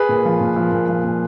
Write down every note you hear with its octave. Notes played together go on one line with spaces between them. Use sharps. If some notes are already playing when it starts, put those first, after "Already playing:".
Already playing: G#4 B4
A#2
F3
A#2
F3
A#2
F3
A#2